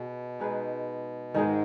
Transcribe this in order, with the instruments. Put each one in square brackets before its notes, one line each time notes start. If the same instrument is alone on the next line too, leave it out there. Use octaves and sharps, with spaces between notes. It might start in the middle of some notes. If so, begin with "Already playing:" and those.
Already playing: [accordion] B2 [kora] G#4 B4
[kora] G#3 D#4 G#4 B4
[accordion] G#2 [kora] D#3 G#3 D#4 G#4